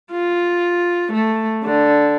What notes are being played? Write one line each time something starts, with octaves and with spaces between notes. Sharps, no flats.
F4
A3
D3